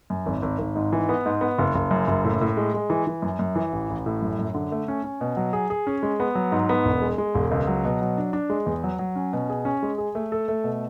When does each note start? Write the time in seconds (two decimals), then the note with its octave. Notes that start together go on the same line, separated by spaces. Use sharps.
0.10 F#2
0.26 G#1
0.42 G#1
0.59 G#1
0.75 G#2
0.93 E3
1.09 B3
1.25 G#2
1.41 B3
1.58 F#1
1.75 F#1
1.91 F#2
2.07 F#1
2.24 A2
2.41 A2
2.57 G#3
2.74 G#3
2.90 E3
3.07 E3
3.22 F#2
3.39 F#2
3.55 E3
3.72 A1
3.89 A1
4.06 A2
4.22 F#2
4.39 F#2
4.54 D3
4.72 A3
4.88 C#4
5.04 C#4
5.21 B2
5.37 F#3
5.53 G#4
5.70 G#4
5.87 C#4
6.03 G#3
6.20 B3
6.35 F#3
6.52 G#2
6.69 B3
6.85 E1
7.01 G#3
7.18 G#3
7.35 E1
7.51 C#2
7.67 F#3
7.85 B2
8.01 F#3
8.18 D4
8.33 D4
8.50 G#3
8.66 E2
8.84 F#3
8.99 F#3
9.16 C#4
9.33 B2
9.50 G#4
9.65 C#4
9.83 G#3
9.98 G#4
10.15 A3
10.32 A4
10.48 A3
10.64 B2